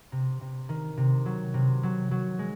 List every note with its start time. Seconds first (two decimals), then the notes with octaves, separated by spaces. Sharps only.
0.12 C3
0.41 C3
0.69 D#3
0.97 C3
1.26 F#3
1.54 C3
1.83 F#3
2.11 F#3
2.39 G#3